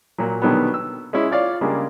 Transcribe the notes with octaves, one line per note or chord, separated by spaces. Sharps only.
A#2 F#3
B2 D3 D#3 F#3 G3 B3
E6
G#3 C#4 E4
F4 C#5 D5 F5
C#3 G3 G#3 A#3 D4